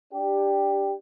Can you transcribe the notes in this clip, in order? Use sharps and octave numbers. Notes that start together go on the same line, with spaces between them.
D4 G4